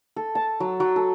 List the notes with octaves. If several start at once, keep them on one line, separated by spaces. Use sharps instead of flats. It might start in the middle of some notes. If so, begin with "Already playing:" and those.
A4
A5
F#3
F#3
A4